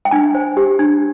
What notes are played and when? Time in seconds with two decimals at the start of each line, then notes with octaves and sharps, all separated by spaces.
0.05 G5
0.11 D4 G#5
0.35 C5
0.57 G4
0.79 D4